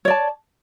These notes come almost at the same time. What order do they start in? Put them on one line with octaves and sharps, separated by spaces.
C#5 D5 A5